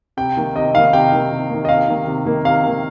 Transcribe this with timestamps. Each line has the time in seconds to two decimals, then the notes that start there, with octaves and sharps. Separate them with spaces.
0.17 C3 G5
0.37 D#3 A#3
0.55 C3 D#5
0.74 D#3 A#3 F5
0.93 C3 G5
1.12 D#3 A#3
1.31 C3
1.50 D#3 A#3
1.65 D#5
1.69 C3 F5
1.88 D#3 A#3
2.07 C3
2.25 D#3 A#3
2.44 C3 F5
2.64 D#3 A#3